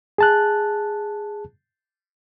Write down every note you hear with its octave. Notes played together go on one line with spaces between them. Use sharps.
G#4 A5 F#6